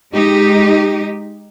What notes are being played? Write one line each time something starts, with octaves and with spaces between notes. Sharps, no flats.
G#3 D#4 G4